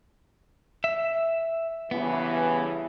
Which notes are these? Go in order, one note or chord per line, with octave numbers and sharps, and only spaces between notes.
E5
G2 C#3 E3 B3